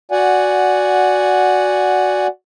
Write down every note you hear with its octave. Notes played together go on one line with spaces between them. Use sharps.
F#4 D5 F#5 G#5